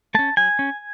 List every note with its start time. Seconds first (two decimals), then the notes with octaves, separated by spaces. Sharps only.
0.14 A3 C#4 A5
0.37 F#3 G#5
0.59 C#4